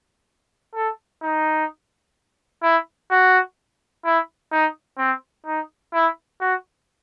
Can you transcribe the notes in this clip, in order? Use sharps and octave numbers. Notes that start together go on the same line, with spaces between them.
A4
D#4
E4
F#4
E4
D#4
C4
D#4
E4
F#4